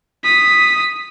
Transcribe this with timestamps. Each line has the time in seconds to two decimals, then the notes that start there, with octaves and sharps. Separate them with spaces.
0.24 D#6 B6